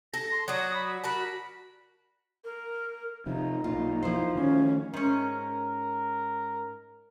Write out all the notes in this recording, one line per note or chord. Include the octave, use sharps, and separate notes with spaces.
A4 A#6
C6
F#3 D4 F#4 D#6
B5
F#4 A#4 A5 B5
A#4
C3 F3 D#4
B1 A#2 F4
F3 E4 C5
D#3 A3 C#4
G#2 C#4 A#4